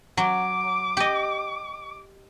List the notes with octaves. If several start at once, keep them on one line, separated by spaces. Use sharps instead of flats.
F#3 D6
G4 D#5